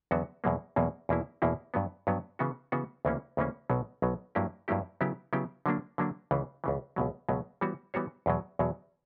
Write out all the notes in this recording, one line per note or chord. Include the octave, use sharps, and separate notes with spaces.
E2 D3 F#3 B3 F#4
E2 B2 F#3 A#3
E2 B2 F#3 A#3
E2 B2 A#3 E4
E2 B2 A#3 E4
G2 F#3 B3
G2 F#3 B3
C#3 E3 B3 F#4
C#3 E3 B3 F#4
D2 C#3 E3 A#3 C#4
D2 C#3 E3 A#3 C#4
B1 B2 F#3
B1 B2 F#3
G2 F#3 A#3 E4 G4
G2 F#3 A#3 E4 G4
C#3 F#3 B3 E4 G4
C#3 F#3 B3 E4 G4
D3 F#3 A#3 D4
D3 F#3 A#3 D4
C#2 C#3 E3
C#2 C#3 E3
C#2 B2 F#3
C#2 B2 F#3
E3 G3 B3 F#4 C#5
E3 G3 B3 F#4 C#5
E2 B2 F#3
E2 B2 F#3